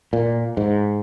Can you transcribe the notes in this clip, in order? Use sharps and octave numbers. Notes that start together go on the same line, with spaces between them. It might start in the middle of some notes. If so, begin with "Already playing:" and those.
A#2
G#2